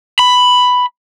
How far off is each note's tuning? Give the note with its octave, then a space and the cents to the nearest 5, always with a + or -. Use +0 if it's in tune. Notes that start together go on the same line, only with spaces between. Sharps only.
B5 +5